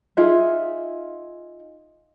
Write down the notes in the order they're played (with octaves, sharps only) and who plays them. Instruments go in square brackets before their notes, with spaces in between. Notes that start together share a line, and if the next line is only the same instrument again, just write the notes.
[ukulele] D#4 F4 G#4 E5